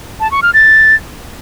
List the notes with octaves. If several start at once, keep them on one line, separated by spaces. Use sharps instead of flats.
A5
C#6
F6
A6